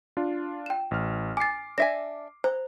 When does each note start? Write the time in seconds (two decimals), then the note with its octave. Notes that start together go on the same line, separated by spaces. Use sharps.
0.17 D4 F4
0.66 G5 E7
0.91 A1 F6
1.37 G#5 D6 A6 C7
1.78 D4 E5 G#5 A#6
2.44 C5 A#5